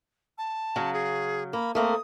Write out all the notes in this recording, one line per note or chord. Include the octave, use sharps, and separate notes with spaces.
A5
C#3 F#3
G#4
A#3 B5
A3 A#3 C4 D#6